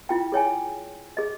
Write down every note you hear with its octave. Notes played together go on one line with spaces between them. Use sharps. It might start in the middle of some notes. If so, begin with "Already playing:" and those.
E4 F4 G5
G#4 C#5 G5 G#5
G#4 D#5